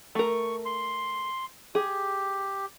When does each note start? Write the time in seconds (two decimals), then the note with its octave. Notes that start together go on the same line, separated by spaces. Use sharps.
0.15 A3 A#4 C#6
0.65 C6
1.75 G4 G#4